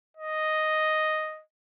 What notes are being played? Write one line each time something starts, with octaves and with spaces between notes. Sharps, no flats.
D#5